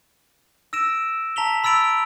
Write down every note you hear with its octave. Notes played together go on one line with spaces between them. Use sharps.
E6 A#6 D7 E7
A5 A#5 B6 F7 G7
B5 E6 A6 D7 F7